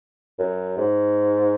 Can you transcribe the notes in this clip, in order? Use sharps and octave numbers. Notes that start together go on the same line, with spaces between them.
F#2
G#2